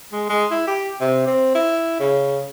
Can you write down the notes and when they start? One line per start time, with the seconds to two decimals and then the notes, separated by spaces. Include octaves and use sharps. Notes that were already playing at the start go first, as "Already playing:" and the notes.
0.12 G#3
0.29 G#3
0.51 E4
0.67 G4
1.01 C3
1.27 C4
1.55 E4
2.00 C#3